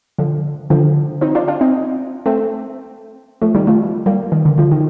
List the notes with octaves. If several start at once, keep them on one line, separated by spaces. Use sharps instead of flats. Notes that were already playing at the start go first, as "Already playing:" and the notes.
D3 F3
D3 F3
C4 D#4
D4 F4
D4 F4
C4 D#4
A3 C4
F3 A3
D#3 G3
F3 A3
G3 A#3
D#3
D3
D3 F3
D#3